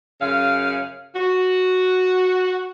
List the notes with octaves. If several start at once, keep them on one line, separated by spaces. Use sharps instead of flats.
F#2 C#3 F5
F#4